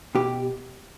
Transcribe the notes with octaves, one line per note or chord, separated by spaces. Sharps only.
B2 G4